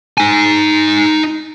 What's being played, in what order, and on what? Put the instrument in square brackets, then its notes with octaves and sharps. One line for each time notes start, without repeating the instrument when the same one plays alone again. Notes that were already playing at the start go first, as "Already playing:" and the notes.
[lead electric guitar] D#4 G#5